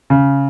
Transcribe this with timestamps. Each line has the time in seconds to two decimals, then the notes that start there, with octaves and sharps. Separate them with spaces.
0.10 C#3